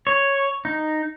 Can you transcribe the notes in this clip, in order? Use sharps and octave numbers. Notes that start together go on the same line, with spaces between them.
C#5
D#4